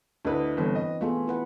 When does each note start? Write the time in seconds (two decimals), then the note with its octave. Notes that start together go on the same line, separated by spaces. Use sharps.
0.25 D2 D4 E4 B4 D#5
0.57 G1 E3 C4 B4
0.75 D#5
1.01 A3 B3 F4 G#4
1.27 E4 B4 F#5